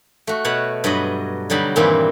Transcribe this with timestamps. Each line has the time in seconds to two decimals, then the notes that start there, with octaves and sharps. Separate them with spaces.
0.27 A3 F#4
0.45 B2 C#5 F#5 B5
0.84 G2 F#3 D#5 B5
1.50 D3 F#3 G3 D#4 B5
1.76 G2 A#2 D#3 E3 G3 C4